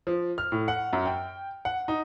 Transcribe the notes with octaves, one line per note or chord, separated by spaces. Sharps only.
F3
F6
A2
F#5
F#2
G5
F#5
D#4